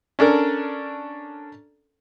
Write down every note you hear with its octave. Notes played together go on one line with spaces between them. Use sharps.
C#4 D4 A4 A#4